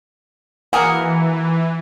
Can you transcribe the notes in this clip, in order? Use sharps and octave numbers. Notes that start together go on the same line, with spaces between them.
E3 A#3 G#4 A#4 F#5